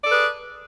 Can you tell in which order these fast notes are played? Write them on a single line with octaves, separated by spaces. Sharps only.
D5 A4 B4 G#4